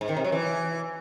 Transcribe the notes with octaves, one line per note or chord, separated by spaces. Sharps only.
G#2
D#3
C3
F#3
E3